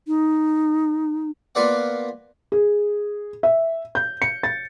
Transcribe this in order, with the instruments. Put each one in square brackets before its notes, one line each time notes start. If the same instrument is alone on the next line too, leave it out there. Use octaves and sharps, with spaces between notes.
[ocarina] D#4
[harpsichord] A#3 B3 F4 B4 D5 F#5
[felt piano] G#4
E5
G6
C#7
A6